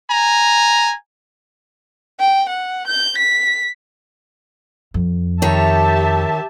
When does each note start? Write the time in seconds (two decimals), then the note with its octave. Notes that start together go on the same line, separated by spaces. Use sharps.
0.11 G#5 A#5
2.20 G5
2.49 F#5
2.88 G6
3.18 B6
4.94 F2
5.42 D#3 G4 C#5 E5 A5